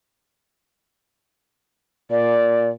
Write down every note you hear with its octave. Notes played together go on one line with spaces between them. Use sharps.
A#2 D5